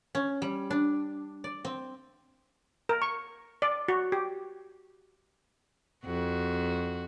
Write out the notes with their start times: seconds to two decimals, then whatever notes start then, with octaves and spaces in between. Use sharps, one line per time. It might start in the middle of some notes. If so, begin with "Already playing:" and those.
0.15 C#4
0.42 G3
0.70 D4
1.44 D5
1.65 C4
2.89 A#4
3.02 C#6
3.62 D5
3.88 F#4
4.12 G4
6.05 F2 F#4